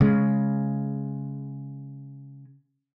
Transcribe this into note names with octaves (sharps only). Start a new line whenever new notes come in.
C#3 G#3